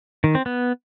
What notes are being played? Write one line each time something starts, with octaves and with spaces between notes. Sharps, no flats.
D#3
C4
B3